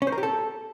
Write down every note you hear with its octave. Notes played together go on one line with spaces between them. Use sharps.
C#4
C5
A#4
G4
A4